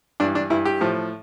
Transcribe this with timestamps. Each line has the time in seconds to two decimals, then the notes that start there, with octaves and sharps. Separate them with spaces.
0.20 G2 E3 D4
0.35 D4
0.50 G2 E3 E4
0.65 G4
0.81 A2 F3